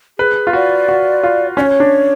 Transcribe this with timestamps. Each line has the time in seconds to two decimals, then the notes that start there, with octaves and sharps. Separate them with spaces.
0.19 G#4 B4
0.47 F4
0.53 F#4 D5
0.89 F#4
1.23 F4
1.57 C#4 D5
1.61 C#5
1.80 D4